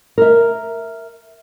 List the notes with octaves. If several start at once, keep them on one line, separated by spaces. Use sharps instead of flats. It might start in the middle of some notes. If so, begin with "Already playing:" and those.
A#4 E5